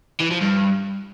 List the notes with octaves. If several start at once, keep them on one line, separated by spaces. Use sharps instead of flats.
E3
F3
G2